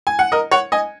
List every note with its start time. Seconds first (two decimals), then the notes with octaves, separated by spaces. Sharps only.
0.07 G#5
0.19 F#5
0.32 A#4 D#5
0.51 C#5 F#5
0.72 D#5 G#5